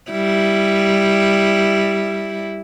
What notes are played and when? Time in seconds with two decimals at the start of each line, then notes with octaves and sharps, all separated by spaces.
0.11 G3 E4